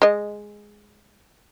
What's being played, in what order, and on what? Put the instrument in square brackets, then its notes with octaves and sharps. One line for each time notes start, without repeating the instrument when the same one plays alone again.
[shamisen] G#3 D#5